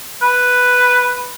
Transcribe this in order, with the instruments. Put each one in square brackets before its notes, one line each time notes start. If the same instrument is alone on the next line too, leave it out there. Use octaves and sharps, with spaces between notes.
[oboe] B4